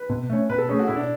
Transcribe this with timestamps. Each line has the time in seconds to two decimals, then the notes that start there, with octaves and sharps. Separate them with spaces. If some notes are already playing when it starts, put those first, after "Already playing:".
Already playing: B4
0.10 B2
0.30 A3 C#4
0.50 B2 B4
0.58 A4
0.68 A3 C#4 G#4
0.79 F#4
0.87 B2 E4
0.96 D4